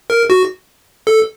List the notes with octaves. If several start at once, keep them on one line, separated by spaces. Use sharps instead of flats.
A#4
F#4
A4